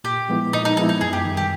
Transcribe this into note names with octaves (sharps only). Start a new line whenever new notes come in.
A#2 G4
F3 G#3 B3 E4
A#2 D#4
D#4
F3 G#3 B3 D#4 E4
D#4
F#2 G#4
G4
D#3 G3
G4